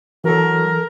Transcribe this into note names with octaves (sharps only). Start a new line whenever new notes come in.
E3 F#3 A4 A#4